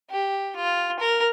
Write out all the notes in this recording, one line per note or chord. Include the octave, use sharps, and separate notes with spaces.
G4
F4
A#4